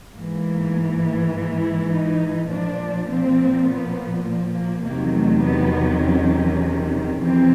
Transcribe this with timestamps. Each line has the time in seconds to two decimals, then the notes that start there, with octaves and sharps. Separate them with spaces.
0.15 G#2 E3 A#3
1.33 A#3
1.62 E4
1.92 D#4
2.50 A#2 F3 D4
3.09 C4
3.68 B3
4.27 A#3
4.57 A#3
4.85 E2 C3 D#3 F#3 A#3
5.14 A3
5.44 B3
6.03 C#4
7.21 F2 C3 E3 C4